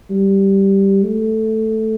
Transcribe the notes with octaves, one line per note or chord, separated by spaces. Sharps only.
G3
A3